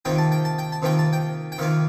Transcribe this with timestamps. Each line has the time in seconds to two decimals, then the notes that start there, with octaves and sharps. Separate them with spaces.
0.05 C3 D#3 A#3 F4 G5
0.18 A5
0.32 G5
0.45 A5
0.59 G5
0.72 A5
0.82 C3 D#3 A#3 F4 G5
0.99 A5
1.13 G5
1.52 G5
1.58 C3 D#3 A#3 F4 F5